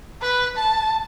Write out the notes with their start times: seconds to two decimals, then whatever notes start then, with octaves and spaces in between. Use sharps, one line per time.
0.22 B4
0.57 A5